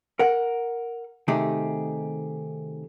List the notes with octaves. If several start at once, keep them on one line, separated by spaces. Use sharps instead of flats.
A#4 F#5
C3 D#3 A3 D#4 G4 G#4